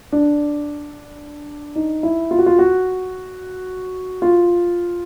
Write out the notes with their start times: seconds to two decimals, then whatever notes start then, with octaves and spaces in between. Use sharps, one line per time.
0.12 D4
1.75 D#4
2.03 E4
2.31 F4
2.39 F#4
2.46 F4
2.59 F#4
4.22 F4